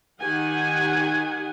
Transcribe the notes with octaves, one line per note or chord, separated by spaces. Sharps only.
D#3 G4 F#5 G#5